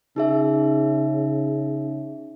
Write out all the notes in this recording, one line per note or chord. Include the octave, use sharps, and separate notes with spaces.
C#3 D#4 G#4 E5